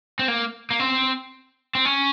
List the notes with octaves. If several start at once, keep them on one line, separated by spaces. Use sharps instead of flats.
C4
A#3
A#3
C4
C4
C#4